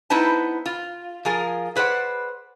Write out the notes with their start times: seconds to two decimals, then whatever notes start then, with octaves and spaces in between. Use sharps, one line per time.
0.10 B3 D#4 E4 B4 C5 A5
0.66 F4
1.25 F3 F4 G#4 A#4
1.76 G#4 B4 C5 D5 F#5